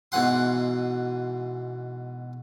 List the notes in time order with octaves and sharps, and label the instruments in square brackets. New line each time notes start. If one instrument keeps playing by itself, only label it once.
[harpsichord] G#2 B2 E3 F#5 C6